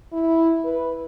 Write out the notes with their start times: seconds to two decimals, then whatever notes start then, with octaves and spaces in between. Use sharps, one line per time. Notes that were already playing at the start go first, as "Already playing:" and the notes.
0.13 E4
0.65 B4